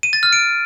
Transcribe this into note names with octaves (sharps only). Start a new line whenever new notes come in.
D#7
A6
F6
D7